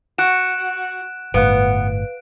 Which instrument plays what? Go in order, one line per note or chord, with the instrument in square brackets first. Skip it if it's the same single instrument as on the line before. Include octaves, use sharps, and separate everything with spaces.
[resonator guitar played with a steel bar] F#4 [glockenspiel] F#6 D7 E7
[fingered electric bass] G1 A2 [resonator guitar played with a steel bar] B3 [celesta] B4 F5 F#6 [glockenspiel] D7